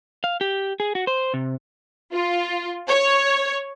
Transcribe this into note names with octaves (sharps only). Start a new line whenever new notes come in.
F5
G4
G#4
F#4
C5
C3
F4
C#5